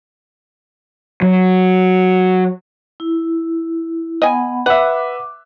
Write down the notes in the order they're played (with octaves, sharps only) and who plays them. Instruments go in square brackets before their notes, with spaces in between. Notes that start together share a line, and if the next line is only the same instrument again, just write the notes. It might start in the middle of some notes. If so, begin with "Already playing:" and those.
[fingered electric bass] F#3
[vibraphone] E4
[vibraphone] B3 F#5 B5 [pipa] D#5 G#5
[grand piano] B4 E5 [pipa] F#5 [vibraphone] D6